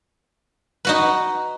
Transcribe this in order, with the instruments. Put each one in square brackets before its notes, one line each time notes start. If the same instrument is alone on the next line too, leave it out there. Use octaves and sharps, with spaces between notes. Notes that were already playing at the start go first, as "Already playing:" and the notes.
[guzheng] D#4 F#4 B4